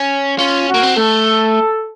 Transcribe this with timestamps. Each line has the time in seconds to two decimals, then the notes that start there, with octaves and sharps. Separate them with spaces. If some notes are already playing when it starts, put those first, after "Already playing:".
Already playing: C#4
0.39 C#4 F4
0.69 F#4
0.74 A#3
0.83 C4
0.97 A3 A4